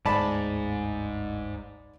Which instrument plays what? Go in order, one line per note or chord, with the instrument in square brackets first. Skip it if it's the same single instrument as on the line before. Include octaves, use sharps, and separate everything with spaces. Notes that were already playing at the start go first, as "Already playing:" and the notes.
[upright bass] G1 D2 [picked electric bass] G#2 [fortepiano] D5 A5 B5